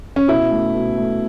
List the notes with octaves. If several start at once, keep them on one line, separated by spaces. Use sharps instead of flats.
C#4
B2 E4
A3
B2
A3